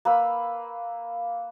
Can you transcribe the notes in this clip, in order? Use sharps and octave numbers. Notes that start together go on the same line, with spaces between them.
A#3 B4 B5 E6